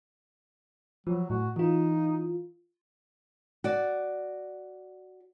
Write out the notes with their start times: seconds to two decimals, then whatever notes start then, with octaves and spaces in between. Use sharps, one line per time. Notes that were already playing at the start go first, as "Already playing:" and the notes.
1.07 F3 F#3
1.30 A2 F#4
1.56 E3 D#4 F4
3.64 F#4 D5